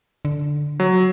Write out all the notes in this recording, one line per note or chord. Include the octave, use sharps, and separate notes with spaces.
D3
F#3